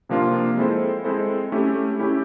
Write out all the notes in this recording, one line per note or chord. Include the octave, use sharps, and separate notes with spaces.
C3 F3 A#3 D4 F4
G#3 C4 E4 A4 C5
G#3 C4 E4 A4 C5
A3 C#4 E4 G4
A3 C#4 E4 G4